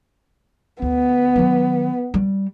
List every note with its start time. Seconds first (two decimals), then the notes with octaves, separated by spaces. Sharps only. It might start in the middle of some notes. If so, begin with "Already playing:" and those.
0.82 D2 B3
1.36 D#3 F#3
2.14 G3